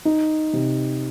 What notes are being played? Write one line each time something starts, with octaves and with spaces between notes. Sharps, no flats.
D#4
C3